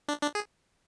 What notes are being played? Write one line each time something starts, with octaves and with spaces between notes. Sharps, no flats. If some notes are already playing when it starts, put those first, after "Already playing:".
D4
D4
G#4